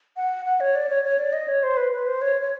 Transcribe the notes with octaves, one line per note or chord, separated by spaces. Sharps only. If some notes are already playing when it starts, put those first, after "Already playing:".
F#5
F#5
C#5
D5
C#5
C#5
D5
D#5
C#5
C5
B4
B4
C5
C#5
C#5